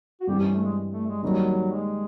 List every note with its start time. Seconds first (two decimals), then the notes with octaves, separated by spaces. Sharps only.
0.21 F#4
0.27 G2 E3 G3 C4 G4
0.40 C#4
0.52 A3
0.63 G#3
0.91 A3
1.07 G#3
1.23 D#3 F#3 G3 A#3 D#4
1.71 G#3